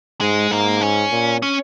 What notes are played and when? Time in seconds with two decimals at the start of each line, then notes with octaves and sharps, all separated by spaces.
0.21 G#2 G#3
0.50 G#2 A#3
0.81 C#4
1.12 A#2
1.42 C#4